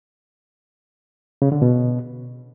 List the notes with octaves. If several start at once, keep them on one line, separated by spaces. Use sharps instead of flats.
C#3
D3
B2